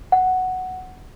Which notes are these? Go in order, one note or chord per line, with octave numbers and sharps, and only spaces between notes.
F#5